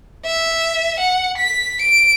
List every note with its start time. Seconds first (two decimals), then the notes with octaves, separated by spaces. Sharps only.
0.25 E5
0.99 F#5
1.38 B6
1.81 D7